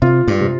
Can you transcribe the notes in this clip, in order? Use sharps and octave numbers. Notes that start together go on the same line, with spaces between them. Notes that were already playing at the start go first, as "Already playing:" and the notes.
C3 F4
G2
C3